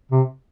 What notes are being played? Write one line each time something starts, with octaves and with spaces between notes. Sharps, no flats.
C3